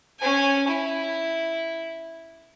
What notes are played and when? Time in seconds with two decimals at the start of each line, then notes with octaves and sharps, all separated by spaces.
0.19 C#4 G#5
0.68 E4